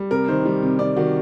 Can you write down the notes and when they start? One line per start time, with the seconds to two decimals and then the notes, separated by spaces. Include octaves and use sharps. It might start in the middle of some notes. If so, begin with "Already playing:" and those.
Already playing: G3
0.11 C3 A#4
0.28 D#3 C5
0.45 G3
0.63 C3
0.79 C3 D5
0.97 D#3 F#4